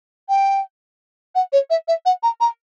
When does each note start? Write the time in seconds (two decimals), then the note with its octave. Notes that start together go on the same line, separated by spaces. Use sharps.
0.29 G5
1.35 F#5
1.53 C#5
1.70 E5
1.88 E5
2.06 F#5
2.23 A#5
2.41 A#5